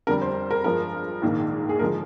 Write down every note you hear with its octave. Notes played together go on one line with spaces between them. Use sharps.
F2 D3 G3 A#4
C5
A#4
G2 F3 G#3 A#4
A#1 G#2 D#3 A#3
G#4
D3 F3 G#3 A#4